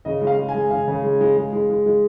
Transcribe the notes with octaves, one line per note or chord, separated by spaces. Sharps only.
C#3 D#5
G#3
F5
G#3
G#5
G#3
C#3 F5
C#3
G#3
G#3
G#3
G#3
G#3
G#3